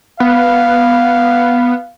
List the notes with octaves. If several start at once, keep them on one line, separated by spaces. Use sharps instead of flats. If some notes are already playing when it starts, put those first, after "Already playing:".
B3 F5